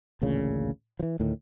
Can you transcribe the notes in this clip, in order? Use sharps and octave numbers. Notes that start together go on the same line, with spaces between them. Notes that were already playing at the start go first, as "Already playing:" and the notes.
A1 D2 A#2 C#3
E3 F3
D2 A2 D#3